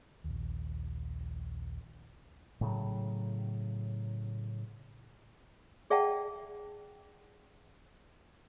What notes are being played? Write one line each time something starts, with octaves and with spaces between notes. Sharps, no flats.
A#1 D#2
A2 C#3 F#3
G#4 D5 E5 F#5 G5 A5